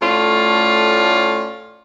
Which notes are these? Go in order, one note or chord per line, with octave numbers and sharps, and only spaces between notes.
A2 A3 C#4 F4 C#5 D5